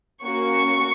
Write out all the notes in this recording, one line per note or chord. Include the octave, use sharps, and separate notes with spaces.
A#3 C#4 F#4 C#6